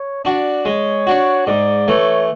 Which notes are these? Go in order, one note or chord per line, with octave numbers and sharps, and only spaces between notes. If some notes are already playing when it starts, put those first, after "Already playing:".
Already playing: C#5
D4 F#4 D5
G#3 C#5
D4 F#4
G#2 D5
E3 A3 C#5